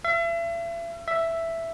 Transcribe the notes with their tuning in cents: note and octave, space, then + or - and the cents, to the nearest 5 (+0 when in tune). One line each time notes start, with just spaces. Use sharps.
E5 +40
E5 +5